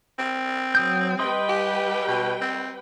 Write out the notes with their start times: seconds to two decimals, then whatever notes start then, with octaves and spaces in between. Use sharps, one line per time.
0.19 C4
0.75 F#3 D#6 G6
1.19 G3 B4 D#5 G5 C6 D#6
1.48 G4
2.08 B2
2.41 C4